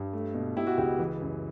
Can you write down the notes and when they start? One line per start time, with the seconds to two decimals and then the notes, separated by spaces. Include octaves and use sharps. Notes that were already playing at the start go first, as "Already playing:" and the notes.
Already playing: G2
0.13 A3
0.35 B2
0.56 B2 E4 G4
0.67 F#4
0.78 C#2 E4 G4
0.99 E3
1.21 F#2